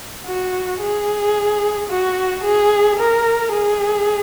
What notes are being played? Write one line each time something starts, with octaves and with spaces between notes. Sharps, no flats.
F#4
G#4
F#4
G#4
A#4
G#4